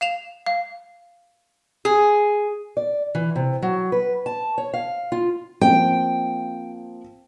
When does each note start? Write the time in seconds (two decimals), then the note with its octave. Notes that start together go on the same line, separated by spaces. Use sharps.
0.01 F5 E7 F7
0.46 F5
1.85 G#4
2.77 D5
3.15 E3
3.36 C3
3.62 F#3
3.92 B4
4.26 A5
4.58 C#5
4.74 F5
5.12 F4
5.61 F3 A#3 C4 G5